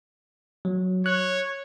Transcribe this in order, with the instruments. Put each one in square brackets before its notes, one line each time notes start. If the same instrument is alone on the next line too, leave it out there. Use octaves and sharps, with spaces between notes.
[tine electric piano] F#3
[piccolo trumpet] C#5 [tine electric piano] F#6